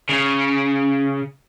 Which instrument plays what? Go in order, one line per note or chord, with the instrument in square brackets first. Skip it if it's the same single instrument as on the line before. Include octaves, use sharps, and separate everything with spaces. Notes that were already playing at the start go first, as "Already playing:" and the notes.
[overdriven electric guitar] C#3